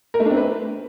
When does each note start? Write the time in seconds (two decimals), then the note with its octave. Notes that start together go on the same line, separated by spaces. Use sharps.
0.14 A#4
0.20 A3
0.25 D4
0.31 C4
0.36 B4